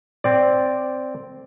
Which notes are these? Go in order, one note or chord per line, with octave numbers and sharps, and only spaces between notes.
C4 D5